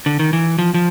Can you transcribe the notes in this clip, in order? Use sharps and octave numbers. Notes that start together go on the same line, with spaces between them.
D3
D#3
E3
F3
F3